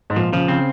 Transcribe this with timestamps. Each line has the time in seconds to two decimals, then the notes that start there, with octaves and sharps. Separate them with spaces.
0.10 G#2
0.16 A#2 F3
0.33 C#3 F3
0.48 C#3 C4